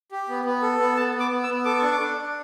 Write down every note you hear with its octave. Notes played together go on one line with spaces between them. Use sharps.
G4
B3
B3
A4
B3
B3 A5
B3
D6
B3
E6
B3
A4 D6
D4 C#6
D6
D4
D4